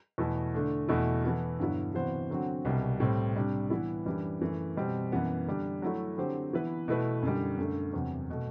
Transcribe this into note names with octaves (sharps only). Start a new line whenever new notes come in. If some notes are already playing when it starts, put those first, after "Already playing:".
E2 B2 A3 E4 A4
D3 A3 D4
E2 B2 A3 E4
E3 B3 E4 A4
G2 D3 F#3 B3 E4
C3 E3 B3 F#4 C5
D3 F#3 C4 F#4
C2 B2 G3
A2 G3 C4
C3 G3 D4
E3 B3 E4
F#2 E3 G3 D4
F#2 E3 A3
B2 G3 C4
F#2 E3 B3
D3 G3 D4
F#3 A3 E4
D3 F#3 C4 G4 C5
E3 B3 E4 B4
B2 A3 E4 B4
F#2 D3 G3
F#2 D3 A3
E2 C3 F#3
B2 A3